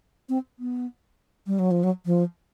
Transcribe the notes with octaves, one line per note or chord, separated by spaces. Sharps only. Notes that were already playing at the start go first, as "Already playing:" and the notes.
C4
B3
G3
F#3
F3
F#3
F3